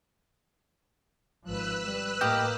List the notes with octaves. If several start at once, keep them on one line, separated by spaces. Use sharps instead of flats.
G#1 F3 B4 E6 F#6
G3
A2 A#3 G4 D#5 D#6 F6 G6